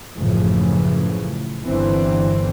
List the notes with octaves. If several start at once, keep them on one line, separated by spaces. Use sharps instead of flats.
A1 F#2 A2 C#3 E3 F3
G1 D3 E3 C4